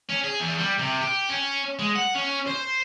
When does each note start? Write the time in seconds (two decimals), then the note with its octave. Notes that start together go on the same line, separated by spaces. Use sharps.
0.10 C#4
0.24 G#4
0.40 E2
0.58 G3
0.79 C3
1.02 G4
1.30 C#4
1.79 G#3
1.95 F#5
2.15 C#4
2.47 C5